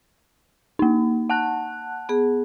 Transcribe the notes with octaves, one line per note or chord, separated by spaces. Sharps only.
A#3 D#4
F#5 A5 F#6
B3 G#4